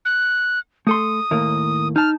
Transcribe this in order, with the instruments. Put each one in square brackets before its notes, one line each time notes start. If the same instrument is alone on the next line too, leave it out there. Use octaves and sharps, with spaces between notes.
[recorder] F#6
[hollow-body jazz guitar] A3 A4 C6 [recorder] D#6
[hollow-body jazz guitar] D#2 A2 A#3
[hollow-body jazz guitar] D#4 A5 [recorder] F6